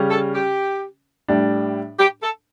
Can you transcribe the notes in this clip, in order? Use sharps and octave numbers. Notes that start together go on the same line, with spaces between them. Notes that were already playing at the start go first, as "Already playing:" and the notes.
Already playing: C#3 G3 C#4
A4
G4
A2 G3 D4
G4
A4